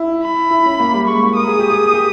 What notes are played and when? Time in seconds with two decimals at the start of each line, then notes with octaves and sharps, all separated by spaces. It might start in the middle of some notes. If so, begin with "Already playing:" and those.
Already playing: E4
0.22 B5
0.51 E4
0.65 C#4
0.80 A#3
0.94 G3
1.08 G#3 C#6
1.22 A#3
1.36 A#4 D#6
1.47 G#4
1.59 G4
1.70 G#4
1.94 G4